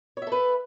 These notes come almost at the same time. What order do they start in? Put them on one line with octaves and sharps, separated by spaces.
C#5 E5 A4 B4